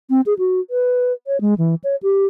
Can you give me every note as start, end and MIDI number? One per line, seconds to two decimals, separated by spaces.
0.10 0.21 60
0.26 0.34 68
0.39 0.60 66
0.70 1.13 71
1.27 1.40 73
1.41 1.54 56
1.58 1.75 52
1.84 1.96 73
2.03 2.26 67